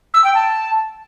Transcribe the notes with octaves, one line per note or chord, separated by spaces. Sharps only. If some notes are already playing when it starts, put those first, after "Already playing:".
E6
G5
A5